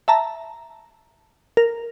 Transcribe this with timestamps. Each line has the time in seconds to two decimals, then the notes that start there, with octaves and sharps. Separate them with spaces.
0.08 E5 A5 A#5
1.57 A#4